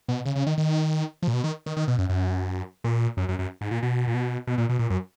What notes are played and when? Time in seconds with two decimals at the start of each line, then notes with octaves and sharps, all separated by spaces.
0.08 B2
0.26 C#3
0.36 C#3
0.47 D#3
0.58 D#3
1.23 F3
1.28 A#2
1.33 B2
1.44 D#3
1.66 D#3
1.77 D#3
1.88 B2
1.98 F#2
2.09 F#2
2.84 A#2
3.17 F#2
3.29 F#2
3.39 F#2
3.61 G#2
3.71 A#2
3.83 B2
4.07 A#2
4.15 B2
4.47 B2
4.58 A#2
4.69 B2
4.79 A#2
4.90 F#2